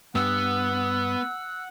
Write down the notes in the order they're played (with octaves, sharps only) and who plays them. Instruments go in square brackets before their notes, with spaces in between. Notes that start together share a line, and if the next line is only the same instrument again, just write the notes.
[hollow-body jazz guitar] G2 [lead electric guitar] B3 [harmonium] F#5 [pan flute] E6